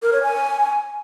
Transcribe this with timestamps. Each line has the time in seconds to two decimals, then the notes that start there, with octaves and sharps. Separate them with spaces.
0.03 A#4
0.13 C#5
0.23 G#5